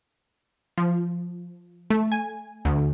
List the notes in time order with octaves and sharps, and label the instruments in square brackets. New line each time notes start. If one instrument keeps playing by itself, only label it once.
[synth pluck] F3
A3
G#5
D2